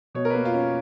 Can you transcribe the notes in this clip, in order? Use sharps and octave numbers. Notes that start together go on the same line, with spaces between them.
B2 C#5
A#4
A#3 B4
F4
C#4
C#5